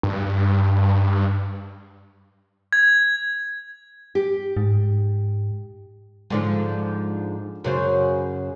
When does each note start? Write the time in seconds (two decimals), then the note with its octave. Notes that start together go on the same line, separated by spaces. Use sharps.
0.03 G2
2.73 G#6
4.15 G4
4.57 G#2
6.30 G#2 D3 F3
7.64 F#2 C#3 C5